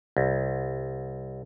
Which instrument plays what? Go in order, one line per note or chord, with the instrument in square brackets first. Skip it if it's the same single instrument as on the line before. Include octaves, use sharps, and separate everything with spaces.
[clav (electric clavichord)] C2